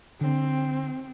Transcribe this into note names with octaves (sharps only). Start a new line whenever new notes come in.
D3 C4